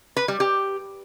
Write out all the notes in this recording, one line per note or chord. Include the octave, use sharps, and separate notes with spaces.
B4
G3
G4